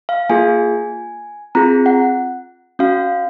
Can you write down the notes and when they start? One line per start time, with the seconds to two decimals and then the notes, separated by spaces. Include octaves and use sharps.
0.09 F5
0.29 A#3 F4 G#4 G#5
1.55 C4 F4 G#4 A#5
1.86 F#5
2.79 C#4 F#4 F5